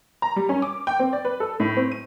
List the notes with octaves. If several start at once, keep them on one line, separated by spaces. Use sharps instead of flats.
A#5
G3
C#4
D6
G5
C4
D5
B4
A4
A2
C4
D#7